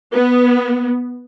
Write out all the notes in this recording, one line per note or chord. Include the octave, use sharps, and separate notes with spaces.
B3